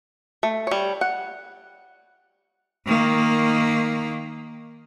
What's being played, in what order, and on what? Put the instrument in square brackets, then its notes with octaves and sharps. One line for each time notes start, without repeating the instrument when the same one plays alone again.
[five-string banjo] A3
G3 C#5
F#5
[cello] D#3 A#3